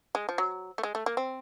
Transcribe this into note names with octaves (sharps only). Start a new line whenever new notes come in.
G#3
F3
F#3
A3
G#3
A3
A#3
C4